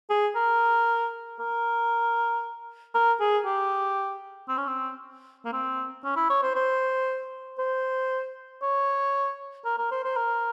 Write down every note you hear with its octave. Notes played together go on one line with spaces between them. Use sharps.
G#4
A#4
A#4
A#4
G#4
G4
C4
C#4
C4
A#3
C4
C#4
E4
C#5
C5
C5
C5
C#5
A#4
A#4
C5
C5
A#4